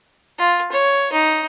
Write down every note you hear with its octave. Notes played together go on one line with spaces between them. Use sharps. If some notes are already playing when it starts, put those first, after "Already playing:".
F4
C#5
D#4